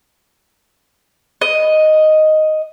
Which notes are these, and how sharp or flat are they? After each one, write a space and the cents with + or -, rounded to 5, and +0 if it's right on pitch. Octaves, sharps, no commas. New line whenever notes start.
D#5 +0